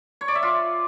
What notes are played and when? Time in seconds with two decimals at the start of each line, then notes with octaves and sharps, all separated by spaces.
0.21 C#5
0.28 D5
0.35 E5
0.43 F4